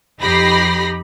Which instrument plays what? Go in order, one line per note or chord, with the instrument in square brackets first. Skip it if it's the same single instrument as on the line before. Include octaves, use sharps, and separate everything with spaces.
[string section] F2 D#4 G4 B5 A#6 C7